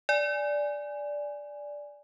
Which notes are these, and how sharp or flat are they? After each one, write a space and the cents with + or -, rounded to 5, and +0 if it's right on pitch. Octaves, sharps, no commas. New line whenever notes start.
D5 -5 G#5 -5